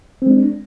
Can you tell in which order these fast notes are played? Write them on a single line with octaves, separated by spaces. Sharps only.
C4 G#3 D4